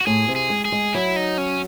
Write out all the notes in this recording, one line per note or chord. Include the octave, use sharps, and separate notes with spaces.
F#4
A2 G#4
C3
G#4
G#3
G#4
G#3
F#3 E4
D#4
C#4